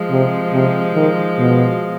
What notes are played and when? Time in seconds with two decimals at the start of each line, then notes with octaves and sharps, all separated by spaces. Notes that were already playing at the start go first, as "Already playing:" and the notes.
Already playing: F3 G#3
0.10 C3
0.53 C3
0.95 D#3
1.38 B2